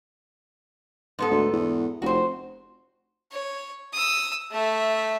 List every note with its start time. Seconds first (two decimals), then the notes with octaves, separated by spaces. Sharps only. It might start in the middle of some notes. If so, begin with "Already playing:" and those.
1.19 G#2 B3 A4
1.31 D2
1.53 E2
2.02 F1 F#4 C5
3.31 C#5
3.93 D#6 E6
4.51 A3 E5